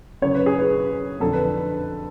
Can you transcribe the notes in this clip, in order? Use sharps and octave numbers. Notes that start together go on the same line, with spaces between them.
F#2 C#3 C#5
B4
G#4
B4
F2 D3 A4
B4